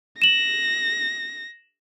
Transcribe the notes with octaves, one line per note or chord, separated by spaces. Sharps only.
A#6 E7 F#7